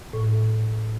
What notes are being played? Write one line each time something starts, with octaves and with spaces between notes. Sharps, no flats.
A2